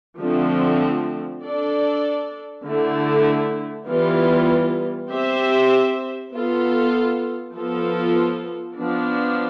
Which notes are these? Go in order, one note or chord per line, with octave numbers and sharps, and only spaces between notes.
D3 F3 A3 C4
D4 A4 D5
D3 A3 E4
E3 G3 B3 F4
C4 G4 C5 E5
B3 F4 A4
F3 B3 F4 A4
F3 B3 D4